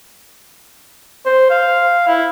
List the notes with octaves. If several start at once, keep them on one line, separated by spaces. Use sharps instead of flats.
C5
F5
E4